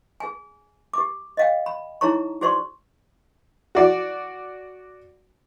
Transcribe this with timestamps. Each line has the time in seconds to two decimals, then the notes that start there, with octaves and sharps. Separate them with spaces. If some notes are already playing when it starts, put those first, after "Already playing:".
0.20 G#4 G#5
0.94 G4 D6
1.37 D#5 F5 G5
1.66 B5
2.01 D#4 E4 G#4 C#5 A#5 C#6
2.41 F#4 G#4 C5 D5 C6 C#6
3.75 F#4 D5